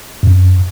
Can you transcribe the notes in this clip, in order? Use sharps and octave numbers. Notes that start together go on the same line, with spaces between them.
F#2